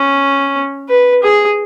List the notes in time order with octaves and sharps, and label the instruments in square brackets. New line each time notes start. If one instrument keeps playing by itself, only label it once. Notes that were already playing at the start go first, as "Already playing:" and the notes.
Already playing: [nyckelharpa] C#4
B4
G#4